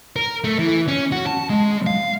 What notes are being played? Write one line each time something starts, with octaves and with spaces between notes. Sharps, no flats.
A#4
A3
E3
C#4
F#4
A5
G#3
F5